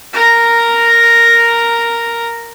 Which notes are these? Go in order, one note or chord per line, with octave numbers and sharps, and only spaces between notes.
A#4 A#5